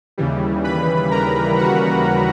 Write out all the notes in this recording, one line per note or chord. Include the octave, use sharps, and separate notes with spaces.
D#2 C#3 E3 G3
B4 B5
A#4 A#5
F#4 F#5